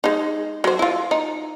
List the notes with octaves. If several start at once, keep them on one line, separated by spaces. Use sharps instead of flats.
G#3 D#4
F#3 C5
E4 F4
D#4